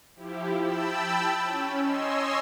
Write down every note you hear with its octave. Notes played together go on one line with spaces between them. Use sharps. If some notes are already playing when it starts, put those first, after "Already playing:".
F3 E4 G4
G5 A5 B5 E6
C#4
C#5 D#5 G#5 C6 E6